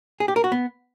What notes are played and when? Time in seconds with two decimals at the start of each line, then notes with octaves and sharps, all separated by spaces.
0.20 G#4
0.28 G4
0.36 A#4
0.44 F#4
0.52 B3